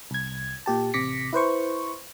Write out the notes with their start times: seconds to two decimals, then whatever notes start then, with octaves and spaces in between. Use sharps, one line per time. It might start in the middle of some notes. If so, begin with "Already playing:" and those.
0.11 C2 G#6
0.66 A#2 G4 A5
0.94 A1 C3 D6 A#6 B6 C#7
1.33 E4 B4 C5 C#6